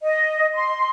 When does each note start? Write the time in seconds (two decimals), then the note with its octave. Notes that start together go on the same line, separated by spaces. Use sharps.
0.02 D#5
0.54 C6